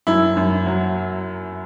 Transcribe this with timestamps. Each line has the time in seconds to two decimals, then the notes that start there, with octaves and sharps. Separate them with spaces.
0.07 F#2 E4
0.37 F#2
0.66 F#3